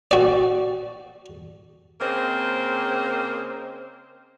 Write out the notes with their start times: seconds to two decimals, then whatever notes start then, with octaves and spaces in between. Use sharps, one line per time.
0.11 F#4 D5
2.00 C#3 A#3 C4 A#4 C5 D#5